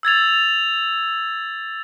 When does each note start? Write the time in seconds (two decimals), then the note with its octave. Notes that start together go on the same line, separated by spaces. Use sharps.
0.03 E6 G#6 A6 F7